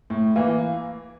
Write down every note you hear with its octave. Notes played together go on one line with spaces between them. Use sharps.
A2
E3 A#3